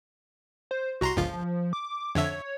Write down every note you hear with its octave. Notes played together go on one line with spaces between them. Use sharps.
C5
C2 F#4 A#5 C6
G1 C#2 F3 F4
D6
F2 D3 C#5 E5